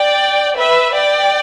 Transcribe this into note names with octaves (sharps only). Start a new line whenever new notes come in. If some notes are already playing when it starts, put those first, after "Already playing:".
Already playing: D5 G5
B4 E5
D5 G5